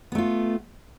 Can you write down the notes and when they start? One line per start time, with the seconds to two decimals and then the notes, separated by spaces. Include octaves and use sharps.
0.12 B3
0.15 A3
0.18 F4